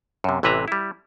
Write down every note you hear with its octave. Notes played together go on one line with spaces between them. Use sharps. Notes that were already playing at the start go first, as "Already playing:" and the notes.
F#2 C3
A1 C3 E3 B4 E5 A#5
G3 E4